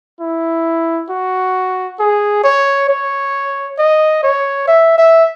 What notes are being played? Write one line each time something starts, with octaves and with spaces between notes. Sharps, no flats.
E4
F#4
G#4
C#5
C#5
D#5
C#5
E5
E5